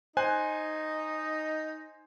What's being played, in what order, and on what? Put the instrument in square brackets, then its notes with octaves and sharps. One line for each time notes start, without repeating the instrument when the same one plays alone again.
[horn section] D#4 [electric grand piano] C5 G#5 F#6